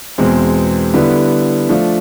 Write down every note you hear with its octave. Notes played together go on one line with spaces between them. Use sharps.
E2 B2 G#3 C4
D3 G3 B3 E4
F3 A3 D4 F4